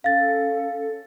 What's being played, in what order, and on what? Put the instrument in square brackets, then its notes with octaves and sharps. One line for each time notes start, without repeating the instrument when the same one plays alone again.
[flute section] C#4 A4 [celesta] F5 A6